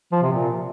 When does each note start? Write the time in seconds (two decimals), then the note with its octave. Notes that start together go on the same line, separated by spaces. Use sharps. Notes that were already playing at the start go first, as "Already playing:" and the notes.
0.12 F3
0.22 C3
0.33 A#2